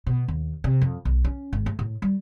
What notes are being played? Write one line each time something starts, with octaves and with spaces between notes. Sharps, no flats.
B2
D#2
C3
F2
B1
C#4
G#1
A3
A2
G3